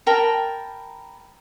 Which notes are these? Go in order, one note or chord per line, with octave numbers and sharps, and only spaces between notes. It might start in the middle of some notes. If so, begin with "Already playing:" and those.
A#4 G5 A5 B5